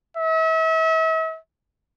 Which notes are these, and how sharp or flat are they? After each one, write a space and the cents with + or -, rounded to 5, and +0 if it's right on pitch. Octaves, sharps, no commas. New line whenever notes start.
E5 -40